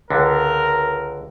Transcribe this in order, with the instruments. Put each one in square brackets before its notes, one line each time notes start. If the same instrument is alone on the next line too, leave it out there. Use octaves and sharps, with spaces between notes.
[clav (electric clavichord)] C#2 D3 [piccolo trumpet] A#4